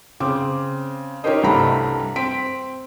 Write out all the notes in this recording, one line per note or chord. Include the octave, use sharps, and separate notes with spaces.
C#3 C4 D6
C#4 D#4 G4 A#4 C5 D#5
C2 G2 A3 G4 A#5 B5
C4 B6 D7